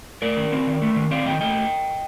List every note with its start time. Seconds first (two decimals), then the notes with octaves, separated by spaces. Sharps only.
0.22 A3 A#4 D5
0.37 D#3
0.52 C4
0.67 D#3
0.82 A3
0.96 D#3
1.11 C4 D5 F5
1.26 D#3 D#5 G5
1.41 A3 D#5 G5